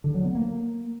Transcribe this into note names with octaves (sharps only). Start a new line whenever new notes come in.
D3
F#3
B3
A#3